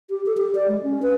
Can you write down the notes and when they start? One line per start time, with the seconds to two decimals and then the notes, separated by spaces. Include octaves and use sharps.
0.10 G4
0.26 A4
0.37 G4
0.55 D5
0.68 G#3
0.83 C#4
1.02 B4